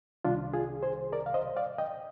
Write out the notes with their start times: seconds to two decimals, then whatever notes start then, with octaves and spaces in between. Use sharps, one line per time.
0.25 C2 C3 D#3 G3 D4 F4
0.54 F4 G#4
0.83 G#4 C5
1.12 A#4 D5
1.26 F5
1.34 C5 D#5
1.57 D5 F5
1.78 D#5 G5